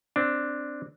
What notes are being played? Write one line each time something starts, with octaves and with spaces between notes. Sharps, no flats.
C4 D4